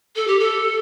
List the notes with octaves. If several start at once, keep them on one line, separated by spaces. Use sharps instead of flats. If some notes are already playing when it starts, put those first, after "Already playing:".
A4
G4
A4